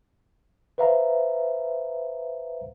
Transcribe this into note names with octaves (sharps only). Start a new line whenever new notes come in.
B4 C5 E5 F5 A#5